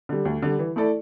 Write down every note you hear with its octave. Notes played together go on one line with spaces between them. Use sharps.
D3 G3
D2
D3 G3
E3
A3 E4 A4 D5